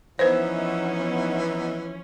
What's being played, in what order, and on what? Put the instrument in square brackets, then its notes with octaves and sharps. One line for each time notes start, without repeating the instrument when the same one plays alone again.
[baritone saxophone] E3 [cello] F3 C#4 [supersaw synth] B3 D#4 E5 [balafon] B4 C5